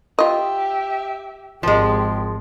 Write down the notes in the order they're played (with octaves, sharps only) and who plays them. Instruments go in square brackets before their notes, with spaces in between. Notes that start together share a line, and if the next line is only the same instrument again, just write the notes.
[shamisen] F4 D#5 [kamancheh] G4 E5
[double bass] G#1 [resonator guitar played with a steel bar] F3 G#3 [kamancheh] G4